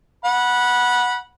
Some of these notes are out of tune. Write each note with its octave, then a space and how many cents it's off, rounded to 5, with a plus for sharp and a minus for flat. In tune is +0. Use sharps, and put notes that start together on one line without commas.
F#5 -10 B5 -20